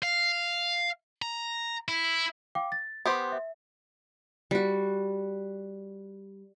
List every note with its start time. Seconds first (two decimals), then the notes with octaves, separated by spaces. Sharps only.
0.03 F5
1.22 A#5
1.88 E4
2.55 F5 G5 D6
2.72 A6
3.06 B3 G4 C5 C6 D#6
3.32 E5
4.51 G3 F#4